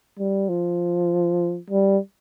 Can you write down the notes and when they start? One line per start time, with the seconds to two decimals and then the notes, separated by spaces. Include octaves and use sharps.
0.19 G3
0.49 F3
1.70 G3